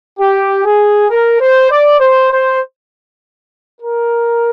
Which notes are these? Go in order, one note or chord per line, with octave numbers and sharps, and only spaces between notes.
G4
G#4
A#4
C5
D5
C5
C5
A#4